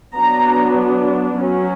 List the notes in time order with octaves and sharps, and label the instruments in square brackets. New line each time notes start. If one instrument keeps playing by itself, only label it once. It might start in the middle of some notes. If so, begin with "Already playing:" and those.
[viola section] F#3 B3 D4 A#5
F#3 C#4